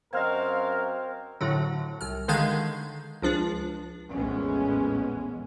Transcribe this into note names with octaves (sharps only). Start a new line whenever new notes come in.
F#2 C4 F#4 A#4 D#5 F5 F6 G#6
A2 D3 F#3
C2 F6
D3 D#3 G#3 F5 G6 G#6
C#2 F3 D4
A#1 E2 A2 G#3 B3 C#4